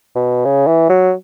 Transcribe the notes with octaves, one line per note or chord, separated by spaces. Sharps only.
B2
C#3
E3
F#3